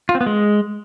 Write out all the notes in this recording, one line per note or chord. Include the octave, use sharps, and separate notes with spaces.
F4
C4
B3
G#3